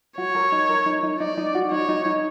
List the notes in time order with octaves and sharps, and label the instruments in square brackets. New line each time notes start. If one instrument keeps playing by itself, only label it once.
[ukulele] F#4 [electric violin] C#5
[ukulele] A#4
D#4
A#4
D#4
D#4
[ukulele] D#4 [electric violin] D5
[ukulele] D#4
F#4
[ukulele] D#4 [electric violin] C#5
[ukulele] D#4
D#4